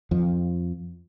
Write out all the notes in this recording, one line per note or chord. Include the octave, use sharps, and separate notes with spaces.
F2 F3